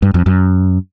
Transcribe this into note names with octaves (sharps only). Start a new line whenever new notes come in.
G2
F2
F#2